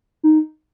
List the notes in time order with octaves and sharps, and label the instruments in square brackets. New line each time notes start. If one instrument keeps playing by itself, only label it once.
[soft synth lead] D#4